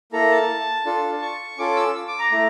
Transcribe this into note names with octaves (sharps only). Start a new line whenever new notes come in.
A#3 E4 A4 A#5
A5
D4 F4 A4
C#6
C#4 F4 A4 D6
E6
D6
A#5
A3 E4